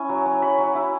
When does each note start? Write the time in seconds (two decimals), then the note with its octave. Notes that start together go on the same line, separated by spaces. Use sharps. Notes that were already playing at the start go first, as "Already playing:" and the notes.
Already playing: C#4 E4 G#5
0.09 F#3
0.26 F#3
0.42 F#3 B5
0.58 F#3
0.75 E4